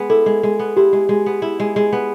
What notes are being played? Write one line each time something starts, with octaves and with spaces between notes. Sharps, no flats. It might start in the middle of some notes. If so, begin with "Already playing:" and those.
Already playing: G#3 B3
E4 A4
G#3
G#3
B3
E4 G4
G#3
G#3
B3
E4
G#3
G#3
B3